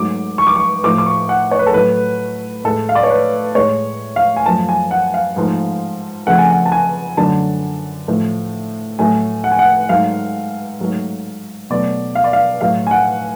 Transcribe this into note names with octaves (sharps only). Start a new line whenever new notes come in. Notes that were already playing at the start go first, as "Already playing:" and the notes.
Already playing: G#2 F#3 A3 D6
C#6
D6
C#6
A2 F3 A3 D6
D6
C#6
F#5
C#5
B4
A4
A2 F#3 A3 B4
A2 G#3 A4
F5
D5
C#5
B4
A2 G#3 C#5
F5
G#5
F#2 F3 A3 A5
G#5
F#5
F5
G#2 F3 A3
F2 C#3 F3 A3 F#5
G#5
F#5
A5
G#5
F#2 D3 F#3 A3 A5
A2 F3 A3
A2 F#3 A3 G#5
F#5
G#5
F#5
G#2 F#3 A3 F5
G#2 F#3 A3
B2 F#3 A3 D5
F5
D5
F5
A2 F#3 A3 F5
G#5
F#5